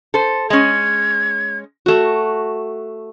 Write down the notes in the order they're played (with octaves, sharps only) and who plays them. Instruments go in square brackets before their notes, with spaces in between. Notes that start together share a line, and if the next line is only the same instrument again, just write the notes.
[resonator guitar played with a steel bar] A4 C5
[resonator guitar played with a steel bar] G#3 C#4 [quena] G#6
[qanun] A3 F#4